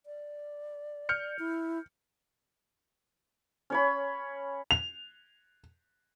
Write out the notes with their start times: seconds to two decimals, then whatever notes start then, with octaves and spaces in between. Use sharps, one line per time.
0.06 D5
1.09 F6 G6 C#7
1.39 E4
3.70 C#4 C#5 B5
4.71 F7